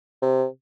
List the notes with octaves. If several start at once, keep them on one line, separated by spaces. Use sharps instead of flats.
C3